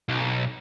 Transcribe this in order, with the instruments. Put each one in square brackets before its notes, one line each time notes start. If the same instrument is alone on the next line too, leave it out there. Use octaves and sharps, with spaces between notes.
[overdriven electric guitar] B1